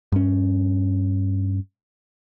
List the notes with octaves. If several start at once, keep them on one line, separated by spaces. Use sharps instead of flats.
G2 C#4